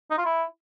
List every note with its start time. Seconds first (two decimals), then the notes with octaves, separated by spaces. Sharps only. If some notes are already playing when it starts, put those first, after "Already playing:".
0.11 D#4
0.18 F4
0.25 E4